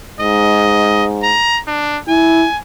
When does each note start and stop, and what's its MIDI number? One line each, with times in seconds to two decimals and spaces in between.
0.20 1.35 44
0.20 1.05 75
1.23 1.60 82
1.67 1.99 62
2.08 2.45 64
2.08 2.58 80